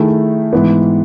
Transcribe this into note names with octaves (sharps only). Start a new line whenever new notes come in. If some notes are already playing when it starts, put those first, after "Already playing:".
Already playing: D#3 A3 E4 G#4
G#2 E3 B3